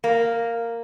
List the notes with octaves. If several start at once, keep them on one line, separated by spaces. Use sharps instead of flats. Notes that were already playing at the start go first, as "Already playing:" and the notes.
A#3